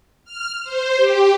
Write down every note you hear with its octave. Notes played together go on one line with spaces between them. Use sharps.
F6
C5
G4